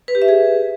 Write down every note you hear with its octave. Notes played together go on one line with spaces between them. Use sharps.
B4
G4
E5
G#4